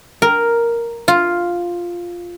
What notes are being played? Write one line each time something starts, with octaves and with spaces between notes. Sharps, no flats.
A#4
F4